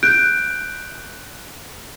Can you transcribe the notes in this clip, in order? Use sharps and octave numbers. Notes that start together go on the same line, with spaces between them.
F#6 G6 D7